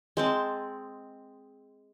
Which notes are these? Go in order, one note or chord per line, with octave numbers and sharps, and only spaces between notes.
G#3 C4 A5